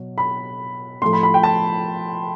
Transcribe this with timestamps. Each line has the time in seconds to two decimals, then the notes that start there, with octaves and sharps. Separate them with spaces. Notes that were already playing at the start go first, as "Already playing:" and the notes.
Already playing: B2 F#3
0.18 B5
1.02 A2 F3 A3 C6
1.13 B5
1.23 B5
1.34 G5
1.43 A5